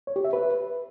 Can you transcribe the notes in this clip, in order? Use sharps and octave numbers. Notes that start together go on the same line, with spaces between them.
C#5
G4
E5
B4